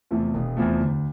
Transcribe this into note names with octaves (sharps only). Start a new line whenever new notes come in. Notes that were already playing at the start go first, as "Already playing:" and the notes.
E2 C3 F3 A3
E1
E2 C3 F3 A3
D2